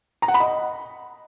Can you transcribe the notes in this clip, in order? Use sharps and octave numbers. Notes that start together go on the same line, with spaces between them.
A#5
F#5
B5
D#5